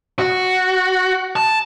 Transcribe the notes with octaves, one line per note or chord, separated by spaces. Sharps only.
F#4
A5